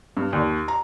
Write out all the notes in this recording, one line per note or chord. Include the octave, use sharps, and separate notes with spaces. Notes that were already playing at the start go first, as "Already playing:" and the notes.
G2
D#2
A#5